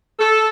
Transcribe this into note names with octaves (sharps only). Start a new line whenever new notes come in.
A4